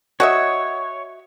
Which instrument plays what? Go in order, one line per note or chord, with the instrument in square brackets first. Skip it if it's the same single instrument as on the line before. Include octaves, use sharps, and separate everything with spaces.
[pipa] F#4 D#5 E5 [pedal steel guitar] C#5